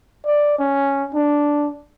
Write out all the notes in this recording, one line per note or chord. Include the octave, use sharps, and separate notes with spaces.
D5
C#4
D4